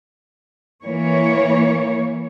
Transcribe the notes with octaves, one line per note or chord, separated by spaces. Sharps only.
E3 A#3 C#5